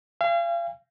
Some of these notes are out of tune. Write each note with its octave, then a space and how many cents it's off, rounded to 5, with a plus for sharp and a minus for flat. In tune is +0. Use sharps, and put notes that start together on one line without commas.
F5 -35 G#5 -40